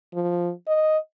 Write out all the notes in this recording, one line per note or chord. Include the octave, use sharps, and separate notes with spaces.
F3
D#5